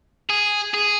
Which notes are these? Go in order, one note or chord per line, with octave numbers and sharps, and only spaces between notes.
G#4
G#4